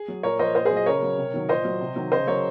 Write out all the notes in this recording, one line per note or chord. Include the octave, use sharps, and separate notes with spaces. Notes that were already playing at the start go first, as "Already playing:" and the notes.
Already playing: G#4
F#3
A#2 A#4 C#5
F3 C5 D#5
A#2 C5 D#5
G#4 C5
F#3
D#5
C#3 A#4 C#5
F#3
C3
D#3 F#3
A#2 C5 D#5
F#3
C3
D#3 F#3
C#3 C5 D#5
F#3 A#4 C#5